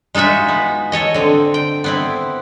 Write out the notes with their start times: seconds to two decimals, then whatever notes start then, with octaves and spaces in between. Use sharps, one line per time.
0.15 G#3 D#4 F4 F#4 E5
0.49 B3
0.92 A4 C#5 D#5
1.14 D3 C4
1.54 G5
1.84 B3 C4 E4